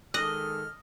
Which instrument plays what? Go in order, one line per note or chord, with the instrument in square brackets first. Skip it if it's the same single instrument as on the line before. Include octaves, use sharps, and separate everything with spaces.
[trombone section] D#3 G#3 A4 [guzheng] D#5 [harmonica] F6 [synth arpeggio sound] F#6 A#6